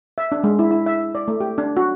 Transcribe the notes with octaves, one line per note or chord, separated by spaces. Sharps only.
E5
D4
G#3
E4
E4
E5
D5
A3
G4
D4
F#4